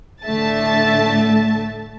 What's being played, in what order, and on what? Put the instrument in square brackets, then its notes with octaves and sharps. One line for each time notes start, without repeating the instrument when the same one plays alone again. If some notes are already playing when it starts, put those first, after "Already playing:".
[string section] A2 D3 A3 E5 A5 A6